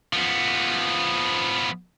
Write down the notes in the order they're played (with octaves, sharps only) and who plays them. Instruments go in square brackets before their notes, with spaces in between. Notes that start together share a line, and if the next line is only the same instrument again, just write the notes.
[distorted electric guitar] F3 B3